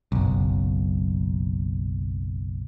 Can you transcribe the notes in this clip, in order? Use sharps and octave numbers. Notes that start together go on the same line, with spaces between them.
F#1 B1